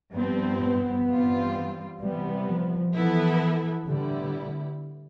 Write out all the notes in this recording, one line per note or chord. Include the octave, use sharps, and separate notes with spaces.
G2 F3 B3 C4
B3
G2 E3 G3 C4 F4
C3 E3 G3 B3
F3
E3 F3 B3 E4 A4
A2 D3 G3 B3 E4